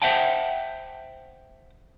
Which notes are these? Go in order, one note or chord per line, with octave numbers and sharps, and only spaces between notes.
C5 E5 F#5 G5 A5